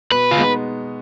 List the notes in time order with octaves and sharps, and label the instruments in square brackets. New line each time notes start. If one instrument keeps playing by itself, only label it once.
[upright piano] B2 [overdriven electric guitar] B4
[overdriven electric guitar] F4
[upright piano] G#3 B3 D#4